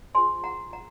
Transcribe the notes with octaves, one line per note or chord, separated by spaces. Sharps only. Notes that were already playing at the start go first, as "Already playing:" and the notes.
F4 G#4 C5 G#5 C6
F#5 A#5
F#5 A#5